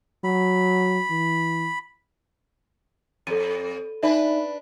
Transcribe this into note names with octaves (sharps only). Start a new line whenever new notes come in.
F#3 B5
E3
F2 A4 D#7
D4 D#4 B4 D5 E5